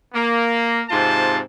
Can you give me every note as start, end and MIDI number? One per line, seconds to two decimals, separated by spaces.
0.14 0.80 58
0.89 1.38 44
0.89 1.38 48
0.89 1.38 60
0.89 1.38 65
0.89 1.38 81